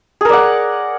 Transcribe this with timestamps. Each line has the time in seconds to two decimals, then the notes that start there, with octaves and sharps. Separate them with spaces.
0.21 G#4
0.25 A#4
0.29 D5
0.33 F#5